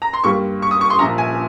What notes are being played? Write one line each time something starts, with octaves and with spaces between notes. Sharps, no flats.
A#5
C6
G2 G3 A#3 C#6
C#6
D#6
C#6
C6
A#1 A#2 F3 A#5
G#5